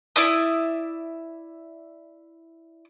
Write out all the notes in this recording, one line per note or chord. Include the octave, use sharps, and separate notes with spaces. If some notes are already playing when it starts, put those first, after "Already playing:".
E4 D5 E5 D#6